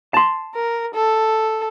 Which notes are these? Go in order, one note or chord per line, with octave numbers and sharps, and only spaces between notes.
A5 C6
A#4
A4